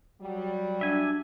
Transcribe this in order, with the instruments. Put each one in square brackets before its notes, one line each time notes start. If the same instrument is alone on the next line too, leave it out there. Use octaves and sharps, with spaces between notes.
[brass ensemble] F#3 G3
[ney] D4 [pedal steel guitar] E5 G#5